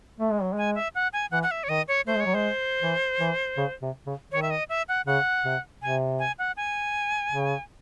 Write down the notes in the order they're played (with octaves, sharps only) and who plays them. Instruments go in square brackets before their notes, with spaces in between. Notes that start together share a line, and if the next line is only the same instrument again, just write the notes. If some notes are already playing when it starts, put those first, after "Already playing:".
[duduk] A3
G#3
F#3
[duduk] G#3 [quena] G#5
[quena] E5
F#5
G#5
[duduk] E3 [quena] F#5
[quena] F#5
E5
C#5
[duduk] D#3 [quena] D#5
[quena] C#5
[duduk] A3 [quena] C5
[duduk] G#3 [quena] C#5
[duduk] F#3
[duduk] G#3 [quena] C5
[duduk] E3
E3
C#3
C3
C#3
[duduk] D#3 [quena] C#5
[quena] E5
D#5
E5
F#5
[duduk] C#3 [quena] F#5
[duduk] C3
[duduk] C3 [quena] G#5
[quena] G#5
F#5
G#5
[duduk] C#3